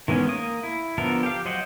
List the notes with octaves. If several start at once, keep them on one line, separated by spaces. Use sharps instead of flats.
D#3 E3 G#3 B3 C#4
A#3 D#6
E4
D3 F3 B3 A4 A#4
G4 F5
F#3 C5 D#5 F#5 G5